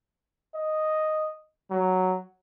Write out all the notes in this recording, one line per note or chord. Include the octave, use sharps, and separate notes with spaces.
D#5
F#3